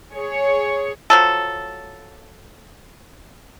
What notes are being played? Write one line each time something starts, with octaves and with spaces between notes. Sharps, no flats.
G#4 C#5
F3 F#3 A4